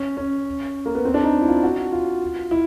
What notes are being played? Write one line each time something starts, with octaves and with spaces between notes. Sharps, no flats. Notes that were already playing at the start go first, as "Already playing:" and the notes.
Already playing: C#4
C#4
A#3
B3
C4
D4
D#4
E4
F4
F#4
F4
E4